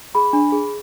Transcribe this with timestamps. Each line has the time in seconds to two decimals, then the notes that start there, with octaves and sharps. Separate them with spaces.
0.15 G#4 B5
0.33 D4
0.52 G#4